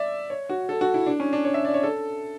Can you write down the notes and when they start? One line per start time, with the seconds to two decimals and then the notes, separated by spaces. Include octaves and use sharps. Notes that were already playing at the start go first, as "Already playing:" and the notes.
Already playing: D5 E5
0.30 C#5
0.49 F#4
0.69 A4
0.81 F#4
0.94 E4
1.06 D4
1.20 C#4
1.33 D4
1.45 C#5
1.54 E5
1.65 D5
1.74 C#5
1.83 A4